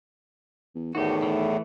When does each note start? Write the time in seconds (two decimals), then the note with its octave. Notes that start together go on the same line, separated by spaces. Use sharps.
0.75 E2
0.95 E2 A2 D#3 F#4 G4
1.23 E3 A3